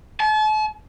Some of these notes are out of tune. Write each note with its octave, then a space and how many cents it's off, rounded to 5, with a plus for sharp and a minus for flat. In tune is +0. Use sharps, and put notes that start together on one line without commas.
A5 -40